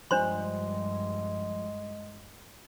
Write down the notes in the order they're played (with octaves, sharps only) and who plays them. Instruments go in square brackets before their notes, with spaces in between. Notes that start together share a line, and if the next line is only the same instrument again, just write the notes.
[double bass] G2 [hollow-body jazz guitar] F3 G3 [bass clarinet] G#3 [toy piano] D4 C5 C6